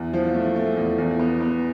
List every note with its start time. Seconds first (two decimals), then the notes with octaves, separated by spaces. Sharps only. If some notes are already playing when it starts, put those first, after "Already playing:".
Already playing: E2
0.13 F3
0.34 A3
0.56 A3
0.77 E2
0.98 E2
1.19 B3
1.41 B3